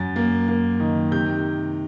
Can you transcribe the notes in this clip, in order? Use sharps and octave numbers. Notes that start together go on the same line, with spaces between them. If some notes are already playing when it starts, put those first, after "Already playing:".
Already playing: F#2 A6
A#3
A#3
D#3
C3 G6